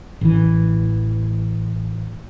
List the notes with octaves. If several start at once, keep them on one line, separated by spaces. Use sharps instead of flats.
A1 E3